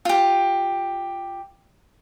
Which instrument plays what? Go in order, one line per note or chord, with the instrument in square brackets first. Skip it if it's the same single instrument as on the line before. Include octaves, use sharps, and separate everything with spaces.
[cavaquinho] F4 G4